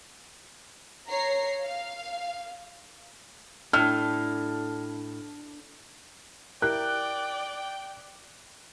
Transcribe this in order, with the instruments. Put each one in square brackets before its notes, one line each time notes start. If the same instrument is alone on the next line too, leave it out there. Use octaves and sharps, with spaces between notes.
[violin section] C#5 A#5 C7
F5
[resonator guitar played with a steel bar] A2 [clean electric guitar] D4 [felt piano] F6
[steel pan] E4 G4 A#4 [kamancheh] D5 [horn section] G5 [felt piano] F#6